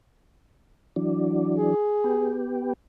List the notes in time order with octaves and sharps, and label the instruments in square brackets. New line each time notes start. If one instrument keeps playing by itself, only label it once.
[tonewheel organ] E3 F#3 D4
[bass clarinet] G#4
[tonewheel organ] B3 G4